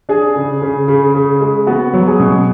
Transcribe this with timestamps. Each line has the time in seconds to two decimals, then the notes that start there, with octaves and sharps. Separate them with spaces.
0.09 D4 G#4
0.36 C#3
0.62 C#3
0.88 C#3
1.14 C#3
1.41 G#3
1.67 B3 F#4
1.94 F#3
2.07 G#4
2.19 B2